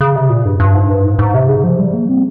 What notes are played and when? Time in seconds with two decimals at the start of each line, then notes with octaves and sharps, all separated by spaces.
0.01 C#3
0.16 C3
0.30 A#2
0.45 G2
0.60 G2
0.74 G#2
0.90 G2
1.05 G#2
1.19 G#2
1.34 C3
1.48 C#3
1.64 F3
1.79 G3
1.93 A#3
2.09 C4